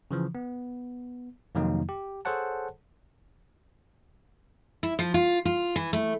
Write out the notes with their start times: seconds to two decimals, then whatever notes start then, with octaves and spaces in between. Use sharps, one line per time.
0.11 C#3 E3 F3
0.35 B3
1.55 F2 C3 D#3 F#3 A#3 D#4
1.89 G4
2.25 G#4 A4 C5 C#5 F#5 A5
4.83 E4
4.99 F3
5.14 F4
5.45 F4
5.76 E3
5.93 A3